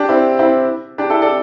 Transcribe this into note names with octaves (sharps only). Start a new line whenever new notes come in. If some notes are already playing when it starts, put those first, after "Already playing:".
Already playing: D4 G4
C4 E4
C4 E4
D4 G4
E4 A4
A4 D5